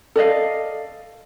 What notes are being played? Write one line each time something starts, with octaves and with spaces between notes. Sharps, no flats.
A4 D5 D#5 F5